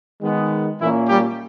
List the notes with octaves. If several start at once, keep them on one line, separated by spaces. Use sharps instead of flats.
D#3 G#3 B3
A#2 E3 A#3 C#4 E4
G3 G4